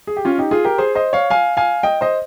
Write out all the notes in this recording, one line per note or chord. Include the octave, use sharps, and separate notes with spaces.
G#4
G4
C#4 F4
D#4 G4
F4 G#4
G4 A#4
G#4 C5
C5 D#5
C#5 F5
F5 G#5
F5 G#5
D#5 G5
C5 D#5